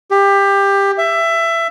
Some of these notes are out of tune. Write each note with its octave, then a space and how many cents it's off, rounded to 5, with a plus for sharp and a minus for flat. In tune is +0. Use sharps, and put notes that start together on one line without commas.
G4 +20
E5 +20